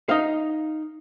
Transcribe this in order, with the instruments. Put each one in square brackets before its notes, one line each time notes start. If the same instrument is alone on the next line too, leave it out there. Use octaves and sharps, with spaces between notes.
[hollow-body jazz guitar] D#4 F5